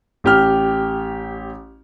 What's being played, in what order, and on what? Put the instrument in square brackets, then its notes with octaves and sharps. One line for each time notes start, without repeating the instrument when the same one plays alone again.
[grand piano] A1 G4 F6